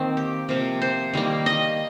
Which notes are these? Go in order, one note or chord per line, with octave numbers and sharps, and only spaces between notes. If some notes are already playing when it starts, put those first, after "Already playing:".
Already playing: D#3 A#3 C4 D#4
G4
C3 F3 A#3
C5
D#3 G3 A#3
D#5